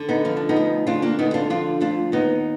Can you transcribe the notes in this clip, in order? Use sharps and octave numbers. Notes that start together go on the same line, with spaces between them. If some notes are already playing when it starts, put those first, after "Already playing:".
Already playing: D3
B3 D#4
F3 D#4
D4
B3 D#4
D2
D2 D4 F4
A#3 D4
D3 B3 D#4
D4 F4
F3 D4 F4
D2 D4 F4
D#2 B3 D#4